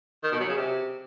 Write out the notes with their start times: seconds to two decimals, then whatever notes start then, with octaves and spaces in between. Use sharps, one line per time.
0.23 D#3
0.32 B2
0.40 F#3
0.49 C#3
0.57 C3